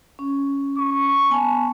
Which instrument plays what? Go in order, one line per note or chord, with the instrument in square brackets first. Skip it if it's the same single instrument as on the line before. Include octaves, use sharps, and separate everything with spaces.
[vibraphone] C#4
[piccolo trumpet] C#6
[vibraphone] B3 G#5 A5